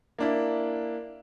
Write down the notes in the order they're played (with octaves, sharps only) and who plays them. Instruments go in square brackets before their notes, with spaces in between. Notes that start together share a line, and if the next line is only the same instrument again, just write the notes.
[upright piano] A#3 D4 E4